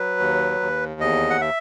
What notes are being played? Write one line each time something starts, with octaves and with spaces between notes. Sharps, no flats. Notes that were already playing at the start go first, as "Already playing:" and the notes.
Already playing: F#3 B4
D#2
D#2
E2 D#5
F#5
E5